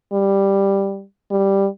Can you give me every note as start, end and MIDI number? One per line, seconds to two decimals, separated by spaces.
0.13 1.03 55
1.31 1.67 55